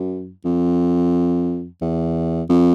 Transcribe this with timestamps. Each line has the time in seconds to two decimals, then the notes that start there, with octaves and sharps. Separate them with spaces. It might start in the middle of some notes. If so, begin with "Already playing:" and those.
Already playing: F#2
0.45 F2
1.82 E2
2.49 F2